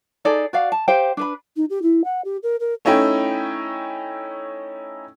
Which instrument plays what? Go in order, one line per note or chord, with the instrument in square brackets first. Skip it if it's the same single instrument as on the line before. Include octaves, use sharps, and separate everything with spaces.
[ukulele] D#4 G#4 A4 D5
F#4 D5 F5
A5
G4 C5 F5 G5
D4 B4 B5
[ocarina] D#4
G4
E4
F#5
G4
A#4
A#4
[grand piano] A3 C#4 D#4 E4 G5